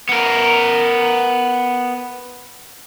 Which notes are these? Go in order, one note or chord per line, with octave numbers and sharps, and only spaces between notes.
B3 A#4